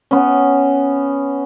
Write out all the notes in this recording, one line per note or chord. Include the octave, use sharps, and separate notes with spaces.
B3 C#4